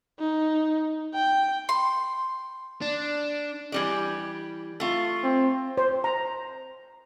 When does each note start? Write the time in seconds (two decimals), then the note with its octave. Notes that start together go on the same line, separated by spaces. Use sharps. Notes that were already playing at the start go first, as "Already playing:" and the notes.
0.19 D#4
1.14 G5
1.69 C6
2.81 D4
3.72 E3 G3 D5
4.80 A3 F4
5.24 C4
5.78 C5
6.04 A#5